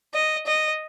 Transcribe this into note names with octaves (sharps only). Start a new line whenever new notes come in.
D#5
D#5